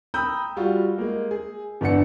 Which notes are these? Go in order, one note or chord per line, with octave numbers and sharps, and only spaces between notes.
G5 A#5 B5 D#6 E6 G6
G3 F4 F#4
G#3 A#3
G#4
G1 E2 D4 F#5 C#7